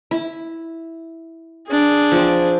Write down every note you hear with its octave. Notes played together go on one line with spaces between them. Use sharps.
E4
D4 G#4
F3 C4